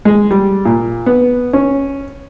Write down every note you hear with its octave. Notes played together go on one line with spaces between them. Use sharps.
G#3
G3
A#2
B3
C#4